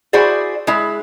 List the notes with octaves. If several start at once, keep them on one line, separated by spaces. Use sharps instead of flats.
E4 F#4 G#4 C5 D5
G#3 E4